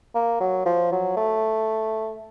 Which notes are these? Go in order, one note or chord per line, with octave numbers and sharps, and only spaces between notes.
A#3
F#3
F3
F#3
A3